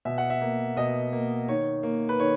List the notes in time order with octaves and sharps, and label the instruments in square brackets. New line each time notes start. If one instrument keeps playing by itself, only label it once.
[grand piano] B2 E5
F#5
E5
A#3
B2 D#5
A#3
D#3 C#5
A#3
B4
D#3 C#5